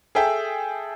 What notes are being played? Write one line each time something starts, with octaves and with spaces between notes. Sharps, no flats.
G#4 A4 E5 G5 A5